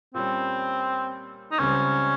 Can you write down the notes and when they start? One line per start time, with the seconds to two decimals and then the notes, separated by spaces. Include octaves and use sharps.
0.14 A#2 G3 C4 C#4
1.51 D#4
1.59 C#2 C#3 G3 C4 C#4